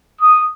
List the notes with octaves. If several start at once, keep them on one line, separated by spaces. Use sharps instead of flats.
D#6